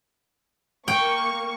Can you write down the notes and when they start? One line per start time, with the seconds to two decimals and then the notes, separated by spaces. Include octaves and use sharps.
0.88 A#3 G5 C#6